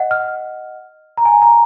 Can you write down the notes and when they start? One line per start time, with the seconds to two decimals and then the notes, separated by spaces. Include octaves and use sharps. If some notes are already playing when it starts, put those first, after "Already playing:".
Already playing: D#5 F#5
0.11 F6
1.17 A#5
1.25 G#5
1.42 A#5